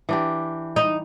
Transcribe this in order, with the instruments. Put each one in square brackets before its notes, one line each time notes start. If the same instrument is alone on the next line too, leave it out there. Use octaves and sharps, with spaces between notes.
[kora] E3 D4 G4
[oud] D#4